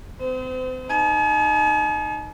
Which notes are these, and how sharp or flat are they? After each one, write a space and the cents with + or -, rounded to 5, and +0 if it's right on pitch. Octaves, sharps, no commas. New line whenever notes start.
C4 -40 C5 -35
D#4 -10 G#5 +45